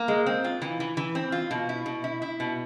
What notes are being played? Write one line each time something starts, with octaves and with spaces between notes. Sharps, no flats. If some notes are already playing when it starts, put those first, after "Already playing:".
Already playing: A#3
G#3
C4
F4
E3
E3
E3
C4
F4
B2
E4
B2
E4
E4
B2